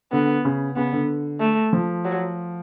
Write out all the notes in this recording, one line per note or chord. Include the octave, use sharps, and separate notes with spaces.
D3 B3
C#3
C#3 B3
D3
A3
F3
F#3